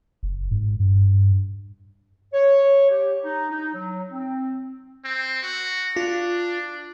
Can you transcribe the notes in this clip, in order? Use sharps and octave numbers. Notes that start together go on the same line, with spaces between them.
F#1
G#2
G2
C#5
G4
D#4
D#4
F#3
C4
C4
F#4
D4 F4